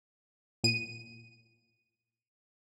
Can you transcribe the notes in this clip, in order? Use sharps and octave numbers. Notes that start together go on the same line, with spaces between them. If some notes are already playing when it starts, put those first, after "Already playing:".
A#2 D#7